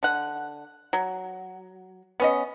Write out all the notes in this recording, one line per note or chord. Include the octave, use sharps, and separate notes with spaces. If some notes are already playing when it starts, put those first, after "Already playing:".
D3 F#5
F#3
B3 C#4 D#5